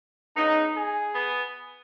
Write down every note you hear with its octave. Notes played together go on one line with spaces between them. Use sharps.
C#3 B3 D#4
G#4
B3